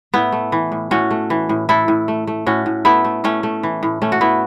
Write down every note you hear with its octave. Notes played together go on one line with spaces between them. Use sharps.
A2 B3 E4
A3
E3
A2
A2 C#4 F#4
A3
E3
A2
A2 E4 A4
A2
A3
A3
A2 C#4 F#4
A2
A3 B3 E4
A3
A2 A3 C#4
A3
E3
A2
A2 A3 C#4
F#4
A3 B3 E4